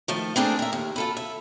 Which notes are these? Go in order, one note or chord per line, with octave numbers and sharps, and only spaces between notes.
D#3 F3 A3
A3 A#3 C4 D4 G#4 A#4
A#4 E5
D#2
F4 A4 B4
E5